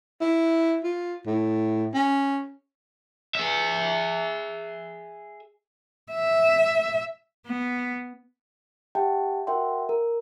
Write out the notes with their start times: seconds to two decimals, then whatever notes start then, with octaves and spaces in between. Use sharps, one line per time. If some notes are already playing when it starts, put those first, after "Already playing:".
0.21 E4
0.84 F4
1.26 A2
1.94 C#4
3.35 G#4 E5
6.12 E5
7.46 B3
8.95 G4 E5 F#5 G5 A5
9.47 F#4 A#4 E5 F#5 G5 C6
9.89 A#4